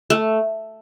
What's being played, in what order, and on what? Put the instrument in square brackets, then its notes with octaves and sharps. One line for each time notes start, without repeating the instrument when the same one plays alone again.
[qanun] A3